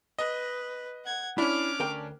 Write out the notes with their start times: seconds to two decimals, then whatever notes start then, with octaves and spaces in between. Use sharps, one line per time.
0.19 B4 D#5
1.05 F#5 G#6
1.38 C#4 D4 E4 D6 F6
1.80 D2 A#4 G5